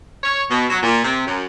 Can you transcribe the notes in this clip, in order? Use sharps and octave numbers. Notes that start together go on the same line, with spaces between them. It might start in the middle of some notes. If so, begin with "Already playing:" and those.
C#5
B2
F#3
A#2
C3
F#2